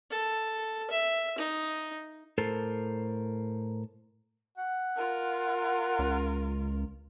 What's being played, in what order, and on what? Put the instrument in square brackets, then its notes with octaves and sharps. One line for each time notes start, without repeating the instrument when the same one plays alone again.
[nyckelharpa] A4
E5
D#4
[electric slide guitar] A2 A4 A#4 C5
[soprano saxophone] F#5
[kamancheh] F4 A#4
[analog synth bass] C#2